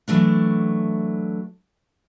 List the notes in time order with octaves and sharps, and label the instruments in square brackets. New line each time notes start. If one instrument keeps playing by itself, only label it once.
[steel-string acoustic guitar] E3 F#3 A3 D4